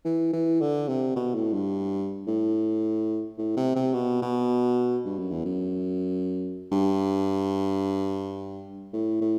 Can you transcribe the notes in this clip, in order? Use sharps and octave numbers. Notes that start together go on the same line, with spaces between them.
E3
E3
D3
C3
B2
A2
G2
A2
A2
C3
C3
B2
B2
G2
F#2
E2
F#2
G2
A2
A2